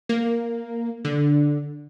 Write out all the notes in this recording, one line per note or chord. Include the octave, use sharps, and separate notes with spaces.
A#3
D3